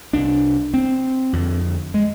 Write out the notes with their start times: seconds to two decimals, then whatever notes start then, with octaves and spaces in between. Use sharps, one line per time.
0.13 C2 C3 D4
0.74 C4
1.33 F2 D3
1.94 G#3